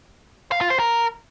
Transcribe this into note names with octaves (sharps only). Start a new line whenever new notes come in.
F5
F4
C5
A#4